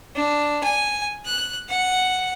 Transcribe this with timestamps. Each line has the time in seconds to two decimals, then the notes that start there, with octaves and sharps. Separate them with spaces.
0.16 D4
0.64 G#5
1.26 F#6
1.70 F#5